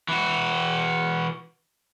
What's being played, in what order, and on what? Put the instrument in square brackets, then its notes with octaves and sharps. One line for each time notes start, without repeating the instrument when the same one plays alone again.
[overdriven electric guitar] E3 F#4